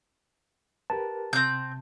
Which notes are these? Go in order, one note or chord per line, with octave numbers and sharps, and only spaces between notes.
G4 A#4 B4 A5
C3 C4 G6